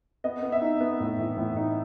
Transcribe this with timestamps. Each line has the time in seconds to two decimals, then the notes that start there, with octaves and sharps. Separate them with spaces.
0.24 B3 D#5
0.43 B3
0.52 E5
0.62 D#4
0.81 B3
1.00 A2
1.19 E3
1.37 A2
1.56 D#4